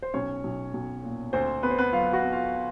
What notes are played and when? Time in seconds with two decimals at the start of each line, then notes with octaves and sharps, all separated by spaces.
0.02 C5
0.14 B1 C#4 C#5
0.44 B1
0.74 B1
1.04 A#2
1.33 D2 C4 C5
1.63 B3 B4
1.71 C5
1.78 B3 B4
1.92 F#3 F4 F5
2.12 F#4 F#5
2.23 B3
2.32 F4 F5